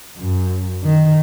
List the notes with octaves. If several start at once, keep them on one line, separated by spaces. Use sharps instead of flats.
F#2
D#3